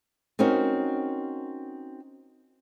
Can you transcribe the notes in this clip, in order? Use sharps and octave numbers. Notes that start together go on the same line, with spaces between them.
C4 C#4 D#4 F#4 A#4